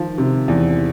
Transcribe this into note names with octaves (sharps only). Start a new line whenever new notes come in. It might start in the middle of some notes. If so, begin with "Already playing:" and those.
Already playing: D#3 F3
C3
E2